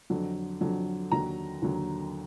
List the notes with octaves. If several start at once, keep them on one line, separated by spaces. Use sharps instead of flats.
F2 D3 F#3
F2 D3 F#3
D#2 D3 F#3 A#5
D#2 D3 F#3